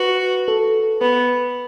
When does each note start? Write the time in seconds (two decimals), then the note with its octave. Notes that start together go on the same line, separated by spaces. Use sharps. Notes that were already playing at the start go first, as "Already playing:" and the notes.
Already playing: F#4 B4
0.48 A4
1.01 B3 B4